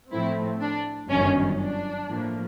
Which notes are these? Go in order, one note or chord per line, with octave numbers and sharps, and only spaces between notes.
A2 F3 A3 C4 E4
D4
G1 F#2 D#3 C#4
D4
A2 F3 A#3